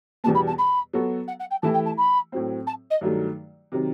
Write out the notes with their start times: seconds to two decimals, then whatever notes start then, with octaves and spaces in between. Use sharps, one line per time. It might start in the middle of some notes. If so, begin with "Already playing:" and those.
0.24 E2 B2 G3 B3 A5
0.35 B5
0.47 A5
0.59 B5
0.93 F#3 B3 F#4 A4
1.28 F#5
1.40 F#5
1.51 G5
1.63 E3 A3 E4 G4 A5
1.74 G5
1.86 A5
1.98 B5
2.32 A2 F#3 C4
2.67 A5
2.91 D#5
3.01 G2 D#3 F#3 A3
3.72 C3 D#3 F#3